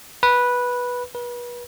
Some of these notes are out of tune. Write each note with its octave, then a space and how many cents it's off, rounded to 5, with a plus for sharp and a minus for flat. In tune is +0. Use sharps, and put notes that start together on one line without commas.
B4 -10
B4 -35